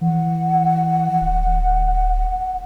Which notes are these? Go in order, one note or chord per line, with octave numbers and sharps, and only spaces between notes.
E3 F#5
D1